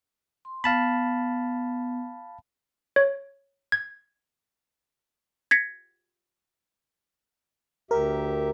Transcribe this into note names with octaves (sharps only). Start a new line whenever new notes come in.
C6
B3 F5 A5 B5
C#5
G#6
G#6 A#6 B6 C#7
D2 G4 A#4 E5